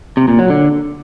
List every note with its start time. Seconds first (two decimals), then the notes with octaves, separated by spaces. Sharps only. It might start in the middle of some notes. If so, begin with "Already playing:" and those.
0.17 C3
0.28 A#2
0.39 F#3
0.50 D3